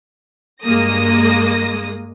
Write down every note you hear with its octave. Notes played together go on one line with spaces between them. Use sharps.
G2 G#3 A#3 D#6 A#6